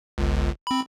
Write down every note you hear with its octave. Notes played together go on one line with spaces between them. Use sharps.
G1 C#2
C4 B5